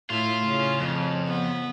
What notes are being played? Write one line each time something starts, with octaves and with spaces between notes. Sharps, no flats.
A2 E4 F4
C#3 C#4
F2
B3